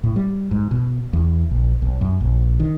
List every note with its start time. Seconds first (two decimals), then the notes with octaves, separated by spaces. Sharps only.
0.04 A2
0.16 G3
0.51 G#2
0.71 B2
1.13 E2
1.51 A#1
1.82 B1
2.01 F#2
2.21 A#1
2.60 D#3